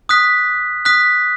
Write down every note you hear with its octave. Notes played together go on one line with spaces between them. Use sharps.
D#6 F#6 B6
D#6 F#6 B6